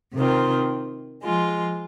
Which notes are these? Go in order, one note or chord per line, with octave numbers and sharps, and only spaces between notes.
C3 D#3 C4 F4
F3 G#3 F4